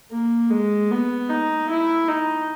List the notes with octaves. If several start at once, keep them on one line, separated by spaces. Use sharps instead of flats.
A#3
G#3
B3
D#4
E4
D#4